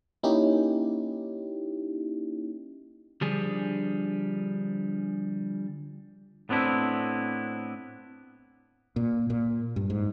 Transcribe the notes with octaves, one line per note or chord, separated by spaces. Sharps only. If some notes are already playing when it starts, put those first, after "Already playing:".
A#3 C#4 D#4 E4 G4
D3 F3 G3 D4 G#4
A2 B3 C4 D4 E4
A#2
A#2
G2
G#2